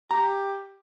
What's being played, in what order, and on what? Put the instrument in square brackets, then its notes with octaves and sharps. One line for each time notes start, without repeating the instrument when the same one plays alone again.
[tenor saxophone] G4 [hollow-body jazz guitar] A#5